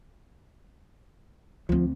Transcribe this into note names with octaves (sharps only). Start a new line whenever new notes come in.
D2 F3 C4